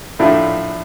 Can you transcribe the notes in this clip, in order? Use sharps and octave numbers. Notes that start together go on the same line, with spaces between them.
A#1 A2 A3 D4 F4